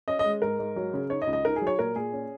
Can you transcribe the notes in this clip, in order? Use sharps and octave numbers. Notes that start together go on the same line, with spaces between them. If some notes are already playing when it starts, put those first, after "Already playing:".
C#4 D#5
D#5
G#3
G#2 A#4
G#2
F#3
C#3
D#4 C#5
D#5
C#2
D#5
D#4 A#4
G#4
F#3
C#5
A#2 A#4
A#2 G#4
C#4